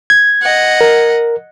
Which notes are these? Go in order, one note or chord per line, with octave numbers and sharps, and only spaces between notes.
G#6
D#5 F#5
A#4